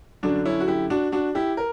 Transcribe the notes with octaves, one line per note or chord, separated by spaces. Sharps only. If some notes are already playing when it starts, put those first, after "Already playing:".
F#2 D3 D4 F#4
C#4 E4
F#4
E4 G4
D4 F#4
D4 F#4
E4 G4
A#4